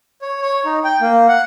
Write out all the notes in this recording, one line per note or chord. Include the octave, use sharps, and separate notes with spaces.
C#5
C#5
D#4
G5
A#3
F#5